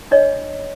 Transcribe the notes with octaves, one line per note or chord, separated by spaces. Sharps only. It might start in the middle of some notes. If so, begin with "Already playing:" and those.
D4 C#5 D#5